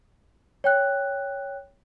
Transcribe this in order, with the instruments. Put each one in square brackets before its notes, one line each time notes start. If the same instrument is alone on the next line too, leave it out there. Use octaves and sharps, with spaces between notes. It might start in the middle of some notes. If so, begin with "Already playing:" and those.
[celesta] C#5 G5 F#6